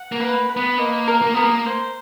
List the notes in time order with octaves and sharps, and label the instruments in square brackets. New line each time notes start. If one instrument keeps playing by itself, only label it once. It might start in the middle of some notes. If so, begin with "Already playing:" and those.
Already playing: [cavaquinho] F#5
[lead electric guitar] A#3
[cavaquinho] B4
B4
[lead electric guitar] B3
[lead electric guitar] A#3 [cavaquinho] D#5
[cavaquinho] A#4
[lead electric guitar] A#3
[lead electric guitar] B3 [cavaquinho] A#4
[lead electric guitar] A#3
[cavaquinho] C5